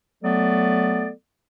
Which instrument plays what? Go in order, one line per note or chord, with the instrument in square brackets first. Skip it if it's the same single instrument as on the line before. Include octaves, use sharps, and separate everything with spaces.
[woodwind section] F#3 A3 B3 A4 D5